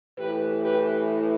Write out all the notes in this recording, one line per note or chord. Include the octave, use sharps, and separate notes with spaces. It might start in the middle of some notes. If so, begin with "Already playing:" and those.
A2 E3 G4 B4
G4 B4